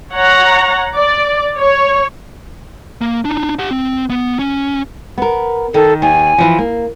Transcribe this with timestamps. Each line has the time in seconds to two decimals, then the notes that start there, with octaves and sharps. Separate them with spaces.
0.14 C#5 F#5 A#5
0.94 D5
1.58 C#5
3.01 A#3
3.25 D4 D#4
3.59 G4 F#5
3.71 C4
4.10 B3
4.39 C#4
5.18 B3 A#4
5.74 D#3 A4
6.02 D#2 G#5
6.38 E3 F3
6.58 A#3